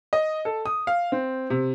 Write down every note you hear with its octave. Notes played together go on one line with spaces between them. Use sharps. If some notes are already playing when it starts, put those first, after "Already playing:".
D#5
A4
D#6
F5
C4
C3